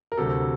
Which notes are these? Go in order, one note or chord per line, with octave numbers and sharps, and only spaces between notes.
A#4
D2 C3 F#3 A4